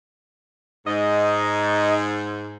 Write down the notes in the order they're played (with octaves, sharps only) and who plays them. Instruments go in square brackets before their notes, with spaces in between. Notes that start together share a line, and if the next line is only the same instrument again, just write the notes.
[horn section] G#2 [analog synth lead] D#5